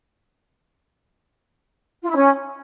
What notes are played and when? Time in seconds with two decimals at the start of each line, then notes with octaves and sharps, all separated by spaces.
2.03 F4
2.09 E4
2.16 C#4